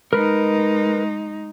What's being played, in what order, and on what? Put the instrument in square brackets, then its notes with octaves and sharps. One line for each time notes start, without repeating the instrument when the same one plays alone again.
[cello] G#3 D#4 [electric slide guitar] A#4 B4